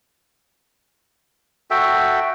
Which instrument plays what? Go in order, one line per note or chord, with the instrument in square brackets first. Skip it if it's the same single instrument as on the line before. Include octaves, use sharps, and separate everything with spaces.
[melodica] F#4 A4 E5 G5